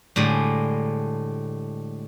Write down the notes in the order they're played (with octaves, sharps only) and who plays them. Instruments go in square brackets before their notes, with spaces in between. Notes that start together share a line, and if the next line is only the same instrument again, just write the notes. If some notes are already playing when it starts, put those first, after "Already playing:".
[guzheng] A2 D3 G3 G#3